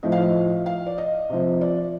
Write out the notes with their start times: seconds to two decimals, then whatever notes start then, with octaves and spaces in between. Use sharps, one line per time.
0.03 A2 F3 D#5
0.12 F5
0.22 D#5
0.66 F5
0.86 D5
0.98 D#5
1.30 C3 F3
1.61 D5